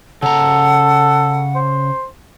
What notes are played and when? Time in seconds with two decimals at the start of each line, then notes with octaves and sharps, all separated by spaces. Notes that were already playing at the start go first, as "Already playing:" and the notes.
0.23 C#3 A4 F#5 A#5
1.55 C5